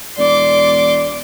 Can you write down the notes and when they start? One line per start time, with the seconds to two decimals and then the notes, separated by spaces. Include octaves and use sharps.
0.18 E1 D5 C6 D6